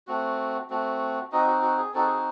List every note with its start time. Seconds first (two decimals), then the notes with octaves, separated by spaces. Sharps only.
0.07 A3 C4 F#4
0.70 A3 C4 F#4
1.32 C4 D#4 F#4 D#5
1.47 F#4
1.62 F#4
1.77 G#4
1.93 C4 D#4 F#4 A4
2.05 G#4